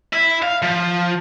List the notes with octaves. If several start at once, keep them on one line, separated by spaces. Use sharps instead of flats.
E4
F5
F3